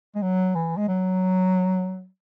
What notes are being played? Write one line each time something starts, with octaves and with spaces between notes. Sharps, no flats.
G#3
F#3
E3
G#3
F#3